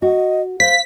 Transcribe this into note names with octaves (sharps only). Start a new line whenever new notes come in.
F#4 D#5
C5 F5 B6